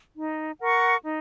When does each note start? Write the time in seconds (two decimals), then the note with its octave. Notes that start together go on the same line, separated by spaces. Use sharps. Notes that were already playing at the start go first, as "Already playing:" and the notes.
0.15 D#4
0.60 A#4 F#5 C#6
1.04 D#4